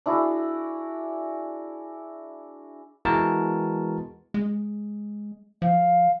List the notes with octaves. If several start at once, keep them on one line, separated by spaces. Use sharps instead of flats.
D4 E4 F#4 G#4
E3 G#3 B3 F#4 A#4 A5
G#3
F3 F5